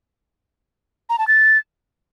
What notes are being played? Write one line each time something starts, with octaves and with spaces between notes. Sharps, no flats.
A#5
A5
A6